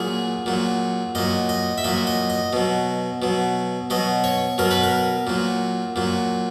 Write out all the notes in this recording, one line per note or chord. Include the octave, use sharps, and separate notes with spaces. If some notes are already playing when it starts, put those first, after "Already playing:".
Already playing: A#2 F#3 G#4
A#2 F#3
A#2 F#3 D#5
D#5
E5
A#2 F#3 D#5
D#5
D#5
B2 F#3
B2 F#3
B2 F#3 D#5
C#5
B2 F#3 A#4
B4
A#4
A#2 F#3
A#2 F#3